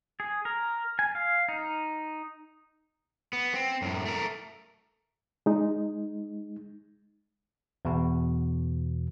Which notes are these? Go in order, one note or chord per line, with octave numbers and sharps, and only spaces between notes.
G#4
A#4
G#5
F5
D#4
B3
C4
F#2 A2
A3 A#4
G#3 D#4
E2 B2